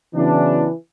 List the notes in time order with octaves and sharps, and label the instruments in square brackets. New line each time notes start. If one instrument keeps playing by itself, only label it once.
[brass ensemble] C#3 F#3 B3 D4 [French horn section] E3